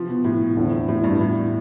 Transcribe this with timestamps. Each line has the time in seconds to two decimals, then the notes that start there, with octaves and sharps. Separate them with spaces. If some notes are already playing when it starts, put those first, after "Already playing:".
Already playing: C3 E3 F3 C4
0.09 B2
0.24 A2
0.56 E2 D3 F3 A3 C4
0.88 A2
1.04 G2
1.20 A2